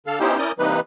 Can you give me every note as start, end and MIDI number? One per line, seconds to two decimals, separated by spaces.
0.07 0.19 50
0.07 0.19 69
0.07 0.19 77
0.20 0.38 59
0.20 0.38 61
0.20 0.38 63
0.20 0.38 64
0.20 0.38 67
0.20 0.38 72
0.38 0.52 61
0.38 0.52 64
0.38 0.52 70
0.38 0.52 74
0.38 0.52 87
0.38 0.52 91
0.59 0.80 48
0.59 0.80 52
0.59 0.80 55
0.59 0.80 58
0.59 0.80 63
0.59 0.80 71